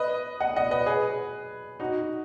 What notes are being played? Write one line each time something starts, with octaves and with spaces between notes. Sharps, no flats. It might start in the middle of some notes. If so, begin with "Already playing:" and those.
Already playing: B4 D#5
D#5 F#5
D#5 F#5
B4 D#5
G#4 B4
D#4 F#4